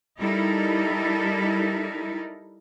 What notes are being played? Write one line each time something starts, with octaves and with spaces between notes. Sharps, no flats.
G3 D#4 E4 A4 A#4